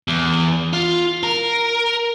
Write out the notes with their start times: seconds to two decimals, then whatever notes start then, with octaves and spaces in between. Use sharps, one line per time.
0.08 E2
0.73 F4
1.23 A#4